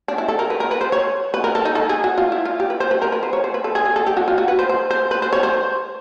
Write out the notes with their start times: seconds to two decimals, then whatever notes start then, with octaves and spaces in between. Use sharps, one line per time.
0.08 D4
0.18 E4
0.28 A4
0.39 A#4
0.50 B4
0.60 A#4
0.71 B4
0.81 C5
0.92 C#5
1.34 B4
1.44 A#4
1.55 A4
1.65 D#4
1.75 A4
1.89 G#4
2.04 F#4
2.18 F4
2.32 E4
2.45 F4
2.60 G4
2.70 B4
2.80 C5
2.91 B4
3.02 A#4
3.12 B4
3.23 C5
3.33 C#5
3.44 C5
3.54 B4
3.64 A4
3.75 G#4
3.86 G#4
3.96 A4
4.06 G4
4.17 F#4
4.28 F4
4.38 F#4
4.48 B4
4.59 C5
4.69 C5
4.91 C5
5.11 B4
5.22 C5
5.33 C#5
5.43 C5